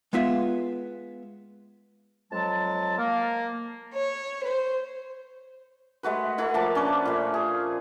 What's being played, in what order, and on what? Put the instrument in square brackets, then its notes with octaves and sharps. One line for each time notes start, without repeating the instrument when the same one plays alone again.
[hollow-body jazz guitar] G#3 B3 F4 E5
[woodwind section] F2 F#3 G#3 A5
A#3
[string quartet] C#5
C5
[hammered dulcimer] G#3 A3 F#4 B4
A3 E4 F#5
F3 A#3 A5
C#4 D4 B4
A#2 A3
G#4